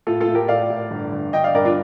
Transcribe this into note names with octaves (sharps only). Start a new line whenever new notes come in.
A2 F4 A4
F4 A4
A2
G4 A#4
A2 D5 F5
A2
G1
G1
G1 D#5 G5
D5 F5
G2 A#4 D5
D4 F4